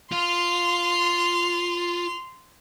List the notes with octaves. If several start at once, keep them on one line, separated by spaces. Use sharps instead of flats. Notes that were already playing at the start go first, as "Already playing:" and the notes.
F4 C6 F7